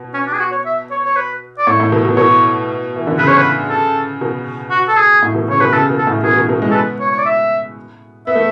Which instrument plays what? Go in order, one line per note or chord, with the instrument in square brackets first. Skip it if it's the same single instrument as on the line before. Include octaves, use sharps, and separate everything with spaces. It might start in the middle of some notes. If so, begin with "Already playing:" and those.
Already playing: [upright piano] B2
[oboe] C#4
D4
G#4
F#4
C#5
E5
C#5
C#5
B4
D5
[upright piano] A2 [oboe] C#5
[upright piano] A2
B2
B2
[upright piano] B2 [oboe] C#5
[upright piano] E3
D3
[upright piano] C#3 [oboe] B4
[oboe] C#5
B4
A4
[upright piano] B2
[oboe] F#4
A4
G#4
[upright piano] A2
B2
[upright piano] C#3 [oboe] C#5
[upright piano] B2 [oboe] B4
[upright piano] C#3 [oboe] A4
[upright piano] B2
[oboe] A4
[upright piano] A2
[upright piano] B2 [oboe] G#4
[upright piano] B2
B2
G#3
[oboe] A4
[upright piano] B3 [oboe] B4
[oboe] C#5
C#5
D5
E5
[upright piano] B3 [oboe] E5
[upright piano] A3